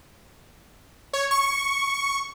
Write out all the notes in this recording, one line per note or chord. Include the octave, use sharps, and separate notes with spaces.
C#5
C#6